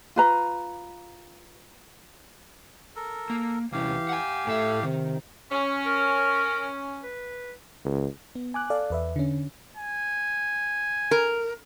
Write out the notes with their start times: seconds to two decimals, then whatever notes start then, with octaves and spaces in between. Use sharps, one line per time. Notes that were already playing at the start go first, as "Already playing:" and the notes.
0.16 F4 B4 A#5
2.96 A4 A#4
3.30 A#3
3.72 C2 E3 C#4 G4 F5
4.09 F#5 G#5
4.47 A2 A3 E5
4.83 C3 D#3
5.52 C#4
5.86 A#4
7.03 B4
7.85 C#2
8.35 B3
8.54 G#5 D6 F#6
8.70 A4 D5 F5
8.90 E2 B4 E5
9.16 D3 C#4
9.77 G#5
11.11 A#4